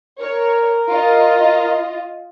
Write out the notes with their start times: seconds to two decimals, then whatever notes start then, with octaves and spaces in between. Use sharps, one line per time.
0.20 A#4 C#5
0.90 F4 D#5